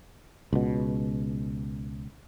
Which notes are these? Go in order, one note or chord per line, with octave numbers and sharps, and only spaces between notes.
C#2 B2